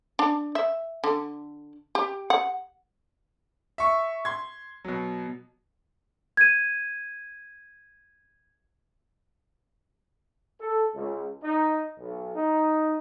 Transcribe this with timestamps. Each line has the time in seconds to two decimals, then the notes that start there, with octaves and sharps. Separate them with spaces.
0.19 D4
0.55 E5
1.04 D3
1.95 G4
2.30 F#5
3.78 E5 C#6
4.25 C6 G#6
4.84 B2 F#3
6.37 G#6 D#7
10.60 A4
10.94 C#2
11.42 D#4
11.99 B1
12.34 D#4